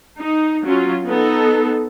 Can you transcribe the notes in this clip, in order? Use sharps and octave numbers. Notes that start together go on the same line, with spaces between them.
D#4
F#3 C#4 F4
B3 D#4 A4